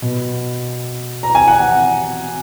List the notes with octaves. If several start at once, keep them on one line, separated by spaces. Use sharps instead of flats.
B2
A#5
G#5
F#5